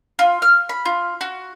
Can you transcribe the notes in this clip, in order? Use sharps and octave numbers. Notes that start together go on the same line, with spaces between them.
F4
F6
B5
F4
F#4